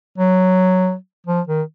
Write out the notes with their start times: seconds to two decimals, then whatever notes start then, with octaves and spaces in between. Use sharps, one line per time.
0.18 F#3
1.27 F3
1.48 D#3